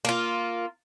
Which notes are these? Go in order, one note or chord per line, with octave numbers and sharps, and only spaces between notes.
A#3 F4